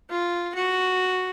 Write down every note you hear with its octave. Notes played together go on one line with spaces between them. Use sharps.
F4
F#4